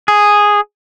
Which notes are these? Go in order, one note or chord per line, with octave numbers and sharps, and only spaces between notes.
G#4